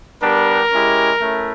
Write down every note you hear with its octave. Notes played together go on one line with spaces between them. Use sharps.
G3 B3 D4 G4 A#4
G#3 C#4 E4 G4
A3 C#4 E4